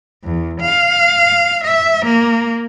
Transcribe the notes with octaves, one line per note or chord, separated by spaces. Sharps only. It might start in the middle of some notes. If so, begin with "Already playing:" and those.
E2
F5
E5
A#3